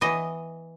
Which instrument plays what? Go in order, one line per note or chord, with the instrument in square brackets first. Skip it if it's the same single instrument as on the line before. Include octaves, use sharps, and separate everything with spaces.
[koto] E3 B3 D#5